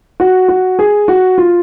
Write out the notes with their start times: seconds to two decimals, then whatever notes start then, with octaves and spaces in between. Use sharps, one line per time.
0.20 F#4
0.48 F#4
0.79 G#4
1.08 F#4
1.38 F4